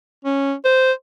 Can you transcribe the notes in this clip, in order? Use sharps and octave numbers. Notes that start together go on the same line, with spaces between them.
C#4
C5